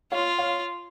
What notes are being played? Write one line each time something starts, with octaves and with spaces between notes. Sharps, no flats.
F4 C#5 F5
C#5 F5